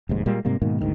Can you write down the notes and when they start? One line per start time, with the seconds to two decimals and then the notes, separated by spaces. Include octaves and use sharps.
0.09 F1 D#2 G#2
0.26 A#2 G3 G#3 A#3
0.45 G#2 C3 G3 A#3
0.62 G#2 B2 D#3 A#3
0.81 G1 D2 G#2 D#3